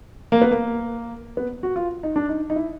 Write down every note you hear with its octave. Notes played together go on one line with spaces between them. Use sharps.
A#3
B3
A#3
B3
F#4
F4
D#4
D4
D#4
D#4
E4